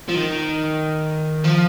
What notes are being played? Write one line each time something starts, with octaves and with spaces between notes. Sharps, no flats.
F3
D#3
F3